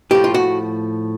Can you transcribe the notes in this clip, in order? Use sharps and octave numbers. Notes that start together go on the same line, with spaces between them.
A2 F3 G4
F4
F#4